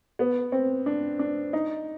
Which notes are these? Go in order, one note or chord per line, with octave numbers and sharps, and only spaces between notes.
B3
C4
D4
D4
D#4